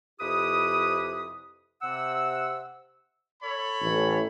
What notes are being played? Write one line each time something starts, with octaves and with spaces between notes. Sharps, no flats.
F2 C3 E4 G4 B4 D#6
C3 F#5 E6
A4 C#5 B5
A1